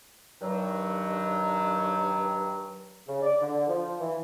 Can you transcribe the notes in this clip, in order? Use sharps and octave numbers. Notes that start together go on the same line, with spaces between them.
G2 D#3 F#3
C#3
D5
D3
F3
E3